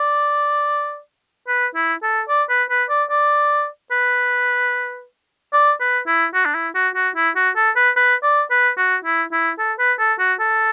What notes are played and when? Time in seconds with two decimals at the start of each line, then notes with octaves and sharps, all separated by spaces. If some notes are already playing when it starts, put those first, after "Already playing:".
Already playing: D5
1.48 B4
1.75 E4
2.03 A4
2.29 D5
2.49 B4
2.70 B4
2.89 D5
3.10 D5
3.91 B4
5.53 D5
5.80 B4
6.07 E4
6.34 F#4
6.46 D4
6.55 E4
6.75 F#4
6.95 F#4
7.16 E4
7.36 F#4
7.56 A4
7.76 B4
7.96 B4
8.23 D5
8.51 B4
8.77 F#4
9.04 E4
9.32 E4
9.59 A4
9.79 B4
9.99 A4
10.19 F#4
10.40 A4